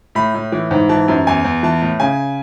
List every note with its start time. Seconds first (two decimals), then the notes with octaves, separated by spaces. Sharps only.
0.15 A2 B5
0.34 A2
0.52 E3
0.71 G#2
0.89 E3 A5
1.08 F#2
1.27 E2 G#5
1.44 E2
1.63 E3 A5
1.81 A2
2.00 C#3 G#5